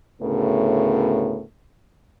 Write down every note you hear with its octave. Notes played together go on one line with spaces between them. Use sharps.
D2 A2 C#3 B3 A#4